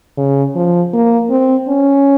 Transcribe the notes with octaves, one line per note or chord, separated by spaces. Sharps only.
C#3
F3
A#3
C4
C#4